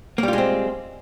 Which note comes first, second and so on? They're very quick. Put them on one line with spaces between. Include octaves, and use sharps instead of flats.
A#3 G3 F4 G#3 C4